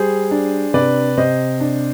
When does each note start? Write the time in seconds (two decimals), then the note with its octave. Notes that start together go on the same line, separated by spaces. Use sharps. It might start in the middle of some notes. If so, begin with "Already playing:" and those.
Already playing: G3 G#4 C5
0.31 D4
0.74 C3 B4 D5
1.17 C3 C5 D#5
1.60 D4